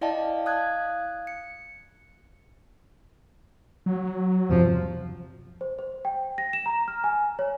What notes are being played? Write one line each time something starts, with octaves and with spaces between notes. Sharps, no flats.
E4 D5 D#5 F5 G5 A5
F5 D#6 F#6 G#6
C#7
F#3
E2 G2 C3 F3
C5
C5
G5
A#6
E7
A#5
F6
G#5
C#5